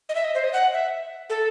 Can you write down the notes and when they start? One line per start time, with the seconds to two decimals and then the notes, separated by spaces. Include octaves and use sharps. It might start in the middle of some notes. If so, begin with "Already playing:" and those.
0.09 D#5
0.15 E5
0.25 D#5
0.35 C5
0.44 D#5
0.53 F#5
0.73 E5
1.30 A4